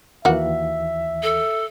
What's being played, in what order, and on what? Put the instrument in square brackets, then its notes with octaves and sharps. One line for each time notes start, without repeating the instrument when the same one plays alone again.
[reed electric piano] D#2 E3 [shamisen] A#3 F#4 F#5 [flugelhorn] E5
[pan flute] A4